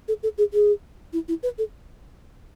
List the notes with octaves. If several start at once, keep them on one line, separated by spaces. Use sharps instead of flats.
A4
A4
G#4
G#4
E4
E4
B4
A4